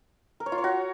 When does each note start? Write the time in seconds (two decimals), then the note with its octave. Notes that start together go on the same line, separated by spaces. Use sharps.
0.40 A#4
0.46 C#5
0.52 F4
0.58 C#5
0.64 F#4